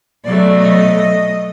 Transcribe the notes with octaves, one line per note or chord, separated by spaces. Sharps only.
B2 F#3 A3 D5
D#5